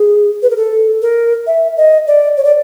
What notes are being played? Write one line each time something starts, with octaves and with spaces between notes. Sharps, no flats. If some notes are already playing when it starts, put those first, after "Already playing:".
Already playing: G#4
B4
A#4
A4
A#4
E5
D#5
D5
C#5
D5